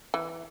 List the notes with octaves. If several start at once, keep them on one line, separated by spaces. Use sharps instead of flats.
E3